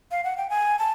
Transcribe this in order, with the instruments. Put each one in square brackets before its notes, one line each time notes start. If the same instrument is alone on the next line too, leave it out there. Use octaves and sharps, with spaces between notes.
[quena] F5
F#5
G5
G#5
A5